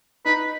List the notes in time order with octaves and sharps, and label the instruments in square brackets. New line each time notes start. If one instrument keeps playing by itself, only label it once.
[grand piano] D#4 [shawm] B4